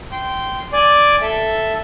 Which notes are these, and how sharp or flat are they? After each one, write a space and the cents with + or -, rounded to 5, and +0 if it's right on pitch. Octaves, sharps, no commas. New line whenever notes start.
G5 -15 C6 -10
D5 +0 G#5 +0 D6 +0
A4 +0 E5 +0